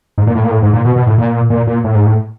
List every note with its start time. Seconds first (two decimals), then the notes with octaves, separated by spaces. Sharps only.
0.18 G#2
0.27 A#2
0.35 A2
0.43 A#2
0.51 A2
0.62 G#2
0.73 A#2
0.85 B2
0.96 B2
1.07 A2
1.18 A#2
1.50 A#2
1.67 A#2
1.84 A2
1.95 G#2
2.06 A2